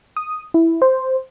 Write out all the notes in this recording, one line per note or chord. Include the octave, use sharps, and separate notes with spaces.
D#6
E4
C5